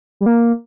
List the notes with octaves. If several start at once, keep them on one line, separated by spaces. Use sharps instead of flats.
G3
A#3